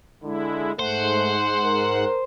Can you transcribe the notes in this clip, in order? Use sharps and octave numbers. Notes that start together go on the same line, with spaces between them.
D3 G#3 E4
G#2 A3 C5 F#5
A#4